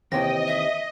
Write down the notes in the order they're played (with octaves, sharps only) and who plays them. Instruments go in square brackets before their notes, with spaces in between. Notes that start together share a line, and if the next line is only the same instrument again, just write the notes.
[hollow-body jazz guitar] D#2 C3 E3 [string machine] D#5 [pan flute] G5 [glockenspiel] A#6
[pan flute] E5